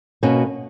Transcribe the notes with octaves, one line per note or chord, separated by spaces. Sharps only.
B2 A#3 C#4 F#4